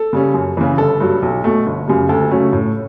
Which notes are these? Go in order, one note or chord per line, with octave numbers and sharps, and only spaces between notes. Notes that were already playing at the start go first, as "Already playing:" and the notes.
Already playing: A4
C#3 G3 C#4
F#2
C#3 E3
G1 A4
G2 F#3
B1
B2 A3
G1
F#2 C#3 G3
D2 A4
C#3 F#3 A3 C#4
A2